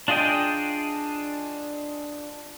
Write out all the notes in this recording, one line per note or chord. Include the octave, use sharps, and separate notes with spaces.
D4 F4 G#4 D#5 G5